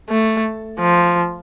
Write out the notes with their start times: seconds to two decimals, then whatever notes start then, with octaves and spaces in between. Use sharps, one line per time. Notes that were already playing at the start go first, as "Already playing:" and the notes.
0.10 A3
0.80 F3